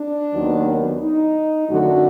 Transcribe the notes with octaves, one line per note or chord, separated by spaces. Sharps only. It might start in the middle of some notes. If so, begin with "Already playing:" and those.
Already playing: D4
D#2 D#3 F#3 B3
D#4
F#2 D3 F#3 A3 F#4